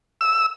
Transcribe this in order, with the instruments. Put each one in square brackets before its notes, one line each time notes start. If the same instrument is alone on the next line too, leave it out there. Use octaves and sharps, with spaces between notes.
[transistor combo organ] E6